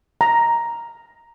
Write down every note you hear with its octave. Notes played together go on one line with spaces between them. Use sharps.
A#5